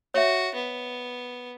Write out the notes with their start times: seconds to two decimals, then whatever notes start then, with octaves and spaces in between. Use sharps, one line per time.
0.14 F#4 C#5 E5
0.55 B3